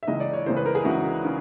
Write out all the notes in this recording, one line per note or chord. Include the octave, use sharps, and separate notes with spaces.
E5
C#2 C#3 E3 D#5
D5
C#5
C#2 C#3 E3 C5
B4
A#4
G#4
C#2 C#3 E3 F#4
C#3